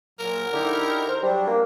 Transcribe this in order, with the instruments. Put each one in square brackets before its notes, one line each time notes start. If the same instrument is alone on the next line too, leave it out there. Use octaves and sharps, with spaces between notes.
[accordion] A#2 F#3 [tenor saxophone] A#4
[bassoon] D3 [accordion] D#4 E4 G4
[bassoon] C5
[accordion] F#3 D4 [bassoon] G3
[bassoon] A#3